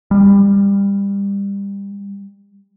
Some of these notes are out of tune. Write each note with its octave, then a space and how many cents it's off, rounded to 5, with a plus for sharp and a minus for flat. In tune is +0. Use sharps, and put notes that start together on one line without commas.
G3 +25